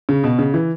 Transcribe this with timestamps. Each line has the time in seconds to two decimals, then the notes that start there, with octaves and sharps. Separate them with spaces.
0.09 C#3
0.24 B2
0.39 C#3
0.54 E3